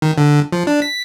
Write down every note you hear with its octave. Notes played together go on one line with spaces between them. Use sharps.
D#3
D3
F3
D4
B6